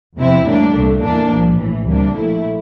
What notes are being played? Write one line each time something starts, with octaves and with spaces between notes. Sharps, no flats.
E2 C3 F3 C4 E4
A2 G3 A#3 D4
C2 A#2 A3
E2 E3 A#3 D4
C2 A#2 F3
A#1 A2 E3
D2 C3 G3 A#3 D4
A#1 A#2 F3 A3 E4